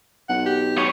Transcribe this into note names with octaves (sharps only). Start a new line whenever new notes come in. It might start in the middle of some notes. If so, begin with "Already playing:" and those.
B1 F#5
G4
B3 C#5